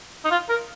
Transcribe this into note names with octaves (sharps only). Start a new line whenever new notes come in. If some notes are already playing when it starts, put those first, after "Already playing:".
D#4
F4
A#4